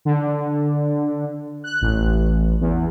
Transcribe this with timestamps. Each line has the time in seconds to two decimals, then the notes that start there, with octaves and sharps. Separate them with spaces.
0.05 D3
1.64 F#6
1.81 A1
2.61 E2